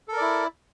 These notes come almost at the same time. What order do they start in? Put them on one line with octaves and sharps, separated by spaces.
A4 A#4 D5 E4